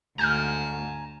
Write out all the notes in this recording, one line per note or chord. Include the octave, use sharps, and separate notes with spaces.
D2 G#5 A#5 F6 G6